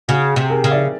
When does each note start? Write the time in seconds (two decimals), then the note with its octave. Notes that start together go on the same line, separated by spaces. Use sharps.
0.08 C#3 F#4 G#4
0.36 C3
0.50 G#4 A#4
0.64 C#3
0.71 D5 E5